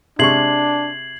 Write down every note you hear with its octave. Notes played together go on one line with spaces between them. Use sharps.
C3 G#3 D4 C#6 G#6 C7 F#7